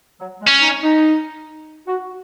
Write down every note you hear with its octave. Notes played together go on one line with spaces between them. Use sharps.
F#3
G#3
C#4
D#4
D#4
F#4